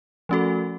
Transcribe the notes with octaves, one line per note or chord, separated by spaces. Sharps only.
F3 A3 C#4 F#4 A4